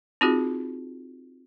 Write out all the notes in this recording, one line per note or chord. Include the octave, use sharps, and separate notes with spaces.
C4 D#4 F4 F#4 G#4